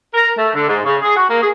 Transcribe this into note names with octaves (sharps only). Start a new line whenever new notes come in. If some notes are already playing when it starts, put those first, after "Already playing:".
A#4
A3
D3
G#2
C#3
G#4
F#4
A#3
G#4